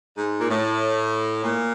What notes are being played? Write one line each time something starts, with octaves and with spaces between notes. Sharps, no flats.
G#2
A#2
A2
A#2